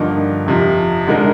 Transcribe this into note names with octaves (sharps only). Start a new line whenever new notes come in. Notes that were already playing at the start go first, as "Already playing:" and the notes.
Already playing: G2 D3 F3 A#3 D#4
F2 C3 F3
D3 G#3 D#4 A#4